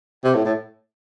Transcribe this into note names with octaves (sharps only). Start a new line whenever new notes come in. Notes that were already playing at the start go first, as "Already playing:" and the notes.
C3
A2
A2